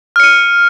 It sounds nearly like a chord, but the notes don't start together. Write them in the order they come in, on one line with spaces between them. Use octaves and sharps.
F6 C#7 D#7